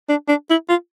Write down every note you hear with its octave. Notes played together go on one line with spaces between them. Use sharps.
D4
D4
E4
F4